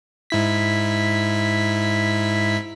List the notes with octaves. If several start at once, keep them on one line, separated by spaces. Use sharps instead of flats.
G#2 E4 B6